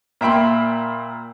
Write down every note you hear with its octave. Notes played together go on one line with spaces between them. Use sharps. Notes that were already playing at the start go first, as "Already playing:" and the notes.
A#2 E5 G5 B5 C6